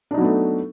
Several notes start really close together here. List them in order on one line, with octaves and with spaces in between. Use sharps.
D4 D#4 F#3 B3 A3